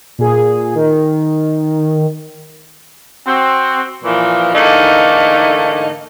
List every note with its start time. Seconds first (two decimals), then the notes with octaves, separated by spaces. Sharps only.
0.18 A#2 G#4
0.75 D#3
3.26 C4 F#4
4.04 A#2 E3 F3
4.54 G#2 D3 E3 A3 A#3 D#4